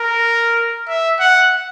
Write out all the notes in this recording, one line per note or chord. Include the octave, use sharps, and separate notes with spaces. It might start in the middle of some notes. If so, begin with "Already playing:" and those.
Already playing: A#4
E5
F#5